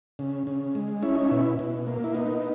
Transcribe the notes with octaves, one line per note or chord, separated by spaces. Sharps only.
C#3
C#3
G#3
C#4 E4
D#4
B2 E4
B2
A#3
E4
B3 D#4